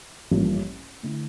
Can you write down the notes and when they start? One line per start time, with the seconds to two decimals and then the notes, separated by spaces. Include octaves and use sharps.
0.31 A1 G2 F3 A#3
1.03 D3 A3 E4